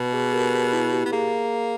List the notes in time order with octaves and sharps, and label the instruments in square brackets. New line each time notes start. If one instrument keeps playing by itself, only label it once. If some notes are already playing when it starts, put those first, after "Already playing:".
Already playing: [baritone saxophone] B2
[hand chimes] G#4 B4
G4 A#4
G#4
E4
G4
[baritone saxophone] B3
[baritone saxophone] A#3 [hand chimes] G#4